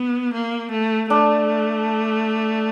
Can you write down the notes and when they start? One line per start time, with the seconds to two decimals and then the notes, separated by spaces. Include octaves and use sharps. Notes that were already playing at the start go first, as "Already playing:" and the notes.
Already playing: B3
0.33 A#3
0.71 A3
1.10 A3 D4